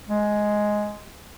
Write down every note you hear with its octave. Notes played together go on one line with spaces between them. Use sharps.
G#3